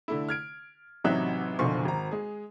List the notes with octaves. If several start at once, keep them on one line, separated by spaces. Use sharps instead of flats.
D3 A3 E4
F6 G#6 D7
A1 C3 F#3 D#4 E5 F#6
F#1 B1 D3 F3 C6 C#6
G#1 A#5
G#3 G#4